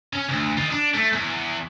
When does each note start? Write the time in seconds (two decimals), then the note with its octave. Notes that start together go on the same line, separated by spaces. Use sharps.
0.13 C#4
0.29 D2
0.57 F4 D#5
0.71 D4
0.95 A3
1.13 E2